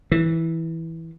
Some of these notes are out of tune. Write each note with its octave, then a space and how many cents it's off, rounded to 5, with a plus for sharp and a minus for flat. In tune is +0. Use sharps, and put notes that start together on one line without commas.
E3 -10